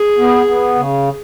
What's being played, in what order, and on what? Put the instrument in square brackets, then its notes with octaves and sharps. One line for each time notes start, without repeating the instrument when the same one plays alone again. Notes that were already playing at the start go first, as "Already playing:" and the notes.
Already playing: [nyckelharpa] G#4
[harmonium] B3
B3
C#3